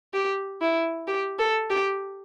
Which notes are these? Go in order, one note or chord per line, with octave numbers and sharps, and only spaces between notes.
G4
E4
G4
A4
G4